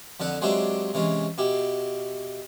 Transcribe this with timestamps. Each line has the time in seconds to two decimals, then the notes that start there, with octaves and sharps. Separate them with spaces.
0.20 F2 D3 A4 F#5
0.41 F#3 G#3 C4 D4 G4 E5
0.94 C3 E3 G#3 C#4
1.38 B2 E4 G4